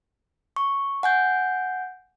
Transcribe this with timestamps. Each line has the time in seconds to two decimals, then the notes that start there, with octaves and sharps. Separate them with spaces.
0.56 C#6
1.03 F#5 G#5 G6